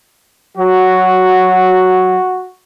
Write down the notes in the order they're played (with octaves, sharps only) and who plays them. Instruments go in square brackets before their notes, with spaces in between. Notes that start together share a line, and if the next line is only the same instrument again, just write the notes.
[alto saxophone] F#3 [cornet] F#4